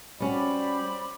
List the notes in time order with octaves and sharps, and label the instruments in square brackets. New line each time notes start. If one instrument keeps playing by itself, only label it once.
[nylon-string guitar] G3 C#4 F#4 [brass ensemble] C5 D5 [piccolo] B5